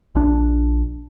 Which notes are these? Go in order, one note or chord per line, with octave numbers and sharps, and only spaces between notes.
A#1 D4